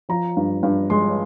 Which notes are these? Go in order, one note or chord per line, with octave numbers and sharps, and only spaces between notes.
F3 A#5
G2
G2
G#3 C6